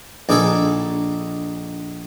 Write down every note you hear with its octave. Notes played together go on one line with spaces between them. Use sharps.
A#1 D4 D#4 G#4 A4